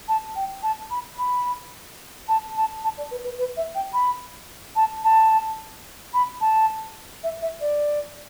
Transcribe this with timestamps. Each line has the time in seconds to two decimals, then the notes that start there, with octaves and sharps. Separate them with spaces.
0.08 A5
0.35 G5
0.62 A5
0.90 B5
1.18 B5
2.28 A5
2.56 A5
2.83 A5
2.97 D5
3.11 B4
3.24 B4
3.38 B4
3.57 E5
3.74 G5
3.93 B5
4.75 A5
5.03 A5
6.13 B5
6.40 A5
7.23 E5
7.41 E5
7.60 D5